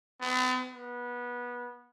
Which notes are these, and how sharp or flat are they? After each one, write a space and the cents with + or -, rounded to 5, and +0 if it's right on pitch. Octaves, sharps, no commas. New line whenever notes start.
B3 +45
B3 -20